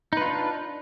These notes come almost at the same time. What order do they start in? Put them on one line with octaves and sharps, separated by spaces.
D#4 B4 F4 D4